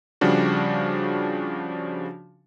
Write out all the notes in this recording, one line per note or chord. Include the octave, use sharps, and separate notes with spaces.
C#3 F3 G3 D4 F#4